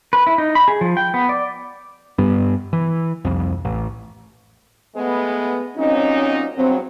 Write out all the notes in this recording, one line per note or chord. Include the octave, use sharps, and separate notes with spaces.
B4
E4
D#4
B5
G#4
F3
G5
B3
D5
G2 G3 B3
E3
C2 F2
A1
G#3 A3 B3
A#2 F#3 C4 C#4 D#4
E2 G2 F#3 C4